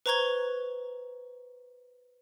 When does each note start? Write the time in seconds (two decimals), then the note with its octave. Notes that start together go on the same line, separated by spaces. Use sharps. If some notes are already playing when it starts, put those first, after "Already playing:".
0.06 B4 C5 A#5 C#6 G#6 G7